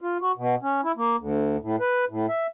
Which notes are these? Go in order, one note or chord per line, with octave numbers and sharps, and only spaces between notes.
F4
F#4
B2
C#4
E4
A#3
D2
A2
B4
A2
E5